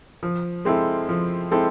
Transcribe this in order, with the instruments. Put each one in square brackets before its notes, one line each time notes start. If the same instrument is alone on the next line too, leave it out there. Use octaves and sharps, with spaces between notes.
[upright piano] F3
G#3 C4 E4 A4
F3
G#3 C4 E4 A4